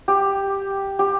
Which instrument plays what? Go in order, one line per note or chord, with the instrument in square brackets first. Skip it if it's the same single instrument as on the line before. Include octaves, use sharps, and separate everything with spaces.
[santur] G4
G4